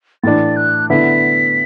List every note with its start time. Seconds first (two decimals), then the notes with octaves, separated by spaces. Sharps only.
0.24 A2 E3 D4 A6
0.56 F#6
0.90 D3 B3 E4 B6